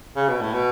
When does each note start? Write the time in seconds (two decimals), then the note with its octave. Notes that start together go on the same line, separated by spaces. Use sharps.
0.16 C#3
0.28 B2
0.41 A2
0.54 B2